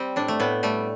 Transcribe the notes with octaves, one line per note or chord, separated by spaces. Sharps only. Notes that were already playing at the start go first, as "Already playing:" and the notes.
Already playing: G3 C4
A2 D4
A3
A2 B3
G3 A3